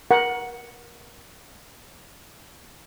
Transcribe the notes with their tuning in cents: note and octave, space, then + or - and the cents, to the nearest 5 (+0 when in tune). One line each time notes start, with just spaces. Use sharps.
A#4 +30 F#5 +0